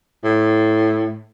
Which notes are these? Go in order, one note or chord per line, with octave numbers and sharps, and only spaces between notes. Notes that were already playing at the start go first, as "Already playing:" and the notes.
A2